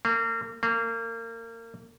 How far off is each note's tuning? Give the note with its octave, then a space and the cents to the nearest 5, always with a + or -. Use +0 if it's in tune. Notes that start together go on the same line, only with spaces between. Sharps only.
A#3 -35
A#3 -30